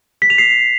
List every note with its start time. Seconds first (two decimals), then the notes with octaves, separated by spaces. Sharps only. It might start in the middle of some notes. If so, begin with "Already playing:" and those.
0.22 B6
0.30 F7
0.38 C7